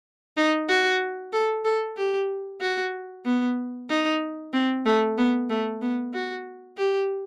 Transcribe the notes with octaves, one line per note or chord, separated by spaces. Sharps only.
D#4
F#4
A4
A4
G4
F#4
B3
D#4
C4
A3
B3
A3
B3
F#4
G4